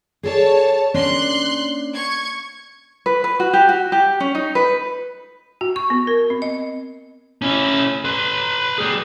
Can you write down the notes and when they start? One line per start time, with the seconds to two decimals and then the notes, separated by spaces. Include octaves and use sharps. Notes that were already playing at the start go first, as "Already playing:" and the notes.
0.23 G#4 A4 C#5 D5 A5
0.94 A#3 C#4 D4 C6 F#6
1.95 C#6 G#6
3.06 B4
3.24 B4
3.40 F#4
3.53 G4
3.69 F#4
3.92 G4
4.20 C#4
4.35 D#4
4.55 B4
5.61 F#4
5.76 C#6
5.90 B3
6.07 A#4
6.30 C4
6.42 D#5
7.42 C#4 E4
8.05 B4 C6
8.78 G3 G#4